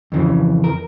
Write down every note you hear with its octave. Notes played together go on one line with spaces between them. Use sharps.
F2 C#3 E3
A#4